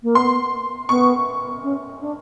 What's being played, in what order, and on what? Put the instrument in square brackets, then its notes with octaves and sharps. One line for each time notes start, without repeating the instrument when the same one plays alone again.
[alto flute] A#3
[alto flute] B3 [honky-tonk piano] C6
[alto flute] B3 [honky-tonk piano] C#6
[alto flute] C#4
D4